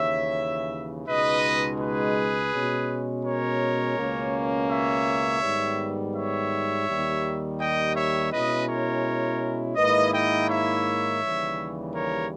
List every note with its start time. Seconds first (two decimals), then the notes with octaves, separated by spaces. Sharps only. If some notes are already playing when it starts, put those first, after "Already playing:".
Already playing: D#2 C#3 E3 C#5 E5
1.08 C#2 B2 G#3 D#4 B4 D#5
1.80 G#4 B4
2.52 B2 G#3 C#4
3.25 A#4 C#5
3.98 C#2 B2 A#3 C#4
4.70 C#5 E5
5.42 G#2 D#3 G3 B3
6.14 C#5 E5
6.87 D#2 D#3 G3
7.60 D#5 G5
7.96 C#5 E5
8.32 B2 G#3 C#4 E4 B4 D#5
8.68 A#4 C#5
9.76 G#2 D#3 A#3 E4 B4 D#5
10.13 D#5 G5
10.50 C#5 E5
11.22 D#2 C#3 E3 G3
11.94 A#4 C#5